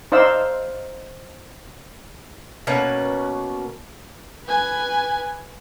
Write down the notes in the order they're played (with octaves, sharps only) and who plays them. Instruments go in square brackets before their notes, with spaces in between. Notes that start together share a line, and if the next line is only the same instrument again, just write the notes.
[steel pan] D#4 C5 D5 F5 E6
[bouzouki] B2 A#3 C#4 B4
[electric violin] B4 G#5